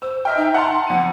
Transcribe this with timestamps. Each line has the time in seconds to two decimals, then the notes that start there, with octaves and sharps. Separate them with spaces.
0.02 C5 E6
0.25 D#5 E5 G5 F6
0.37 D#4
0.54 F#5 A5 A#5 C6
0.87 F2 F#5 D#7